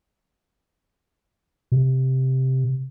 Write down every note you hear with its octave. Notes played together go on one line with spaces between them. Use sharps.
C3